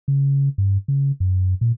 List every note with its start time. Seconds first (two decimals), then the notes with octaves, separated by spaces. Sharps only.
0.08 C#3
0.58 G2
0.88 C#3
1.20 F#2
1.61 A#2